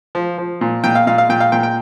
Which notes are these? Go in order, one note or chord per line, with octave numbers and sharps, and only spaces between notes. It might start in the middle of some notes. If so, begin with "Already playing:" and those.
F3
F3
A#2
A#2 G5
F5
A#2 F5
F5
A#2 G5
F5
A#2 G5
G5